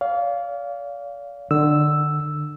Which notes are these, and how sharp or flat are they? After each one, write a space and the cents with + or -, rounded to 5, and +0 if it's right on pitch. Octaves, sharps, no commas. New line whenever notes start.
D5 -45 F5 +0
D3 +30 E6 +0